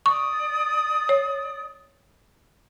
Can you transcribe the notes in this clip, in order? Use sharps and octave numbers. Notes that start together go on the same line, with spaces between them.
D5 C#6 D#6
C#5